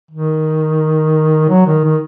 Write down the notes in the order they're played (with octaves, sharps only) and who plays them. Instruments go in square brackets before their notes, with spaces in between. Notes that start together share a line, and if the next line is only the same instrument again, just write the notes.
[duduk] D#3
F#3
D#3
D#3